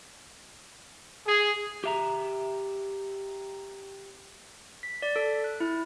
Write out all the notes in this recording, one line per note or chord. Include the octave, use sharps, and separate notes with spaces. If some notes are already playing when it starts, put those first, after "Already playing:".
G#4
G4 E5 A#5
B6
D5
A4
F#6
E4